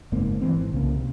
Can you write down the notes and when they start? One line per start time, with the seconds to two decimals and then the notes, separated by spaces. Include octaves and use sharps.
0.12 F#1 G#2 A#3 C4
0.41 E3 C4
0.54 G#1
0.73 C2 C#3 A#3
0.95 C3